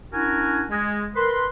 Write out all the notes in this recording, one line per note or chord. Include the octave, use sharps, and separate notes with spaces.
C#4 D4 E4 F#4 A#4 G#5
G#3
A#4 B4 C6